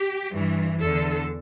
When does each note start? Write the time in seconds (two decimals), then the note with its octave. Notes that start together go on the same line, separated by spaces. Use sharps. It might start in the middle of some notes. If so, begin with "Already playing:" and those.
Already playing: G4
0.31 G2 E3
0.80 E2 D3 A4